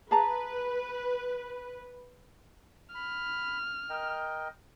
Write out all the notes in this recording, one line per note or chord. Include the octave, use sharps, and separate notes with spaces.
G#4 B4 A5 A#5
B5 F6
A#4 D#5 G5